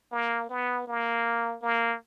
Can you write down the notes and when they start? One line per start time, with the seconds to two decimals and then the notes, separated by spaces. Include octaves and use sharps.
0.12 A#3
0.49 B3
0.88 A#3
1.62 A#3